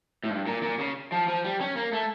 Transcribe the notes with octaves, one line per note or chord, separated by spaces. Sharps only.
A2
G2
A#2
A#2
C#3
F3
F3
G3
C#4
A#3
A3